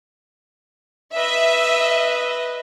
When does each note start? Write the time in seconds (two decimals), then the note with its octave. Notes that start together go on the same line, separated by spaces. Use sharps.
1.16 B4 D#5 E5